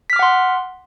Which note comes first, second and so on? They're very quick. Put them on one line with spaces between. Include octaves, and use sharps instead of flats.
B6 F6 D6 F#5 C6